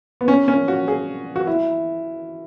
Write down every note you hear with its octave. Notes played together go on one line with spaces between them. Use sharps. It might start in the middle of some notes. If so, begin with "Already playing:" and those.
B3
C#4
C#4
F#4
G#4
F#4
E4